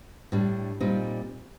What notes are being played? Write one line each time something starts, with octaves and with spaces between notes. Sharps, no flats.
A2 G3 D4
A#2 G3 C4 D#4